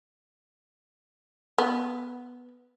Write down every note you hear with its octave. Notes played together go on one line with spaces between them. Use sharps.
B3